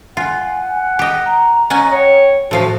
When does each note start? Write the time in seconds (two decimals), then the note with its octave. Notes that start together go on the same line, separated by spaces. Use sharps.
0.17 F4 F#5 G#5
0.99 G4 D#5
1.25 A#5
1.70 C#4 D#5 F#5 G#5
1.92 C#5 G5
2.51 A2 F3 F#4 F5 A5